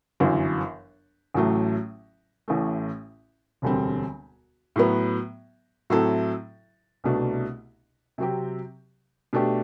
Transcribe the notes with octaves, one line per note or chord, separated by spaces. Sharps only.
G1 F#2 E3
A1 A2 F#3 A3
A1 A2 E3 A3
E1 D2 D3 G3 C4
A2 F#3 B3
A2 F#3 C4 E4 A4
C2 B2 A3 D4
C3 F#3 C4 G4
B2 A3 D4 G4